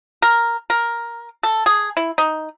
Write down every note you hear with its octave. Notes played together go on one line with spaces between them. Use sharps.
A#4
A#4
A4
G#4
E4
D#4